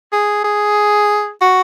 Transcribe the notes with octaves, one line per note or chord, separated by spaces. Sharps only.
G#4
G#4
F#4